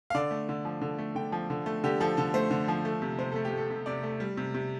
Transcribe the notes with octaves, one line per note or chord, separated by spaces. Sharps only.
F5
D3 D5
A3
D3
F3
D3
A3
D3 G5
F3
D3
A3
D3 G4
F3 A4
D3 A4
A3 C5
D3
F3
A3
C3
C3 C5
A3 A4
G4
A3 A4
C3
C3 D5
A3
G3
C3
C3